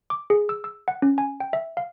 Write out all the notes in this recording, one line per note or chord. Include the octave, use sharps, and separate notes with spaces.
D6
G#4
E6
E6
F#5
C#4
G#5
G5
E5
F5